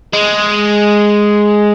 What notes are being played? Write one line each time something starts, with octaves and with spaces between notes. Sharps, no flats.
G#3